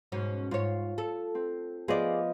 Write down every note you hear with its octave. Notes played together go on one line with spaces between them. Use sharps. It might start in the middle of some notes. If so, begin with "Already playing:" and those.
G#2 B2 C#4
G#2 F4 C#5
A4
C4
F3 B3 G#4 D5 D#5